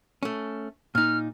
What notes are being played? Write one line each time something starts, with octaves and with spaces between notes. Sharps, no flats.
A3 C#4
A#2 D#4 F6